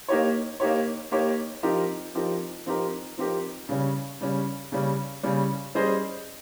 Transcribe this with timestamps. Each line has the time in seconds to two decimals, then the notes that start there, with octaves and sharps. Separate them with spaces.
0.09 A#3 D#4 G4 C#5
0.60 A#3 D#4 G4 C#5
1.12 A#3 D#4 G4 C#5
1.63 F3 C4 D#4 G4 A#4
2.15 F3 C4 D#4 G4 A#4
2.66 F3 C4 D#4 G4 A#4
3.17 F3 C4 D#4 G4 A#4
3.69 C#3 G3 C#4
4.21 C#3 G3 C#4
4.72 C#3 G3 C#4
5.23 C#3 G3 C#4
5.75 G3 C#4 G#4 C5 D#5